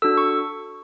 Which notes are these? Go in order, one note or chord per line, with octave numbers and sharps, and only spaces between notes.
D4 F#4 A4 E6
C#6